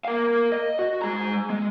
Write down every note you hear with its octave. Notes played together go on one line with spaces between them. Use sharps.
A#4 F5
D#5
F#4
G#3 A#5
G#3